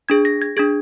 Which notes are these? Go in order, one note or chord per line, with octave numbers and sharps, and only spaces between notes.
D4 G#4 G#6
A#6
G#6
D4 G#4 G#6